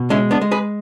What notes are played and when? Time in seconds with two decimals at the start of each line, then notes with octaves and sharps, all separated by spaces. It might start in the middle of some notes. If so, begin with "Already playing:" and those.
Already playing: B2
0.10 G#3 C#4 E4
0.31 B3 D4
0.41 G#3
0.51 G#4 B4